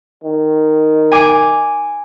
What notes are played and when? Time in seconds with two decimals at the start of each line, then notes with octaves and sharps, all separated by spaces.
0.24 D#3
1.12 G#5 D6